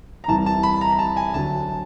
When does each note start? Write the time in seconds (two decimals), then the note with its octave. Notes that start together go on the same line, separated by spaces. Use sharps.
0.24 A#5
0.28 C2 C3 E3 G3 A5
0.46 A5
0.63 B5
0.81 A#5
0.92 A#5
0.99 A5
1.17 G#5
1.33 D2 D3 F#3 A5